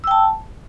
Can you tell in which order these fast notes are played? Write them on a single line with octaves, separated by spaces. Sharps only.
E6 G5 A5